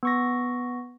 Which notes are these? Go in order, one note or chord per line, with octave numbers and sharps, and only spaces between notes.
B3 C#6 A#6